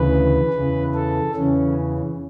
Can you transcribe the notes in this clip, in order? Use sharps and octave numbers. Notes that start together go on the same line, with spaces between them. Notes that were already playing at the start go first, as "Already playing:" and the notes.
Already playing: D2 C#3 E3 B4
E2 C#3 E3
A4
E2 C#3 E3 C#4